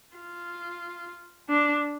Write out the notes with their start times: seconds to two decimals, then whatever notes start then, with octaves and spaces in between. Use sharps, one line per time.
0.16 F4
1.49 D4